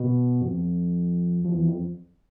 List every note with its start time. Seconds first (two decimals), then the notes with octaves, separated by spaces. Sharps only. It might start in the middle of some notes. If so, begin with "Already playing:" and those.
Already playing: B2
0.41 F2
1.45 F2
1.53 E2
1.68 F2